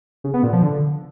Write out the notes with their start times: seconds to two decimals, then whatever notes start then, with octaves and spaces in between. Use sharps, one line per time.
0.24 C#3
0.34 B3
0.43 A#2
0.53 F3
0.62 D3